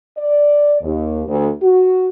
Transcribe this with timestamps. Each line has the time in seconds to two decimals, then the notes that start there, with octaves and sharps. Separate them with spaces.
0.17 D5
0.82 D#2
1.27 D2
1.62 F#4